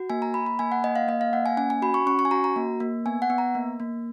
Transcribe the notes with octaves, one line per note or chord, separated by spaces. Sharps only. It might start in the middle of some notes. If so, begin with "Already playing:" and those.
Already playing: F#4
A#3 G#5
A#5
A#3 B5
B5
A#3 G#5
F#5
A#3 D#5
F5
A#3 D#5
F5
A#3 F#5
G#5
C#4 G#5
G#5
F#4 B5
C#6
C#4 C#6
C#6
G#5
F#4 A#5
A#5
A#3
A#3
B3 G#5
F#5
B3
A#5
A#3
A#3